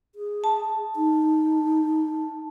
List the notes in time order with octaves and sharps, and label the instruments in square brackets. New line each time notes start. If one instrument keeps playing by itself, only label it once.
[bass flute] G#4
[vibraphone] A5
[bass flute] D#4